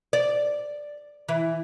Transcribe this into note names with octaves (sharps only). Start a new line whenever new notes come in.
D5
E3